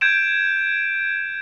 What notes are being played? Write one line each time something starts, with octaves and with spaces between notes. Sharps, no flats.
G6 G#6 D7 E7